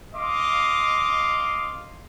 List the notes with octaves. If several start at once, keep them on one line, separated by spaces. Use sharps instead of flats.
D#5 F5 C6 D6